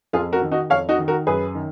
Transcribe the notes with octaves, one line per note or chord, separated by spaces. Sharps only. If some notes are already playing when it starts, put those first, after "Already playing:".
F2 F4 G#4
F#4 A#4
D#3
D#4 F#4
F2 C#5 F5
D#4 F#4
D#3
F#4 A#4
F#2 G#4 B4
D#3